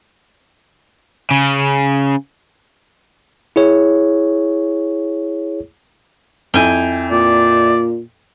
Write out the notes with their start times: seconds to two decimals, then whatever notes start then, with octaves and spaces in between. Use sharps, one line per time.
1.31 C#3
3.56 E4 G#4 C#5
6.54 F2 E4 G5 G#5
7.11 A#2 D5